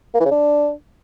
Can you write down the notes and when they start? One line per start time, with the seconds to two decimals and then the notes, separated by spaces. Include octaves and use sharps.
0.14 A#3
0.20 E3
0.25 C#3
0.31 D4